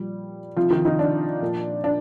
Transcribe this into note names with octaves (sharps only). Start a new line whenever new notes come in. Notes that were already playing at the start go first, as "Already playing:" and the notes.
Already playing: A#2 F3 G3
C3 D#3 F3 F4
D#3 D#4
D#3 D#4
D4
A#2 F3
D4